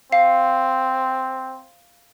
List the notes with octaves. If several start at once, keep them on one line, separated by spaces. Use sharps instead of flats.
C4 F5